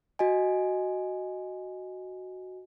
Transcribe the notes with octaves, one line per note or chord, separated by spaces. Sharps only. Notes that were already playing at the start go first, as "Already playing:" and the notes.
F#4 D#5 G#5